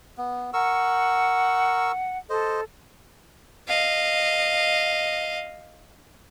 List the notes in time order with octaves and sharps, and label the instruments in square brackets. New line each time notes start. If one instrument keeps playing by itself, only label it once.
[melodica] B3
[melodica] A#4 C#6 E6 [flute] F#5
[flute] A4 [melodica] C5 D#5
[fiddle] D#5 F5